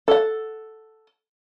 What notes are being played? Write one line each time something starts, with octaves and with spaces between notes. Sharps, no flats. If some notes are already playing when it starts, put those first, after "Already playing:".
A4 F#5